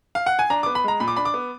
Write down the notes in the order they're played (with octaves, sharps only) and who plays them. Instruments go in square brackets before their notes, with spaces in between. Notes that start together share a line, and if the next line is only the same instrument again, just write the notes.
[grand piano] F5
F#5
G#5
D4 A#5
B3 D6
B5
G#3 A#5
A#2 B5
D6
D4 B5
D6
B3